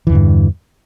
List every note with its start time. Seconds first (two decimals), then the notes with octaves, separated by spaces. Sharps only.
0.07 E3
0.10 E2
0.12 D3
0.15 G2